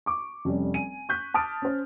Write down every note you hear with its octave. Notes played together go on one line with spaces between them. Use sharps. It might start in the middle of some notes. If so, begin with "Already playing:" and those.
C#6 D6
F1 G3 C#4
G#5 D#7
C#6 F#6 G6 B6
A5 D6 D#6 F6 A6 D7
C#4 C5